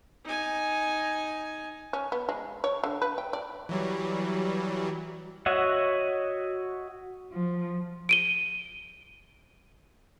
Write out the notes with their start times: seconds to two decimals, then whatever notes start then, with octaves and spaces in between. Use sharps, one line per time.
0.25 D#4 G#5
1.93 C#4
2.12 B3
2.29 G#3
2.64 C#5
2.84 D3
3.02 B4
3.18 G5
3.33 D5
3.69 E3 F#3 G3
5.46 F#4 C#5 D#5 E5 F#5
7.31 F3
8.09 D7 D#7 G7